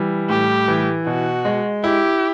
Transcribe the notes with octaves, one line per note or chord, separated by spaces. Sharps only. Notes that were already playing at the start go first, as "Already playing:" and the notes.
Already playing: E3 G3
A2 G4
E3
B2 F#4
G#3
E4 G4